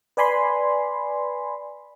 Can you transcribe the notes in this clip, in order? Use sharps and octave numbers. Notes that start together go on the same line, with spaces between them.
B4 D5 G#5 B5 C6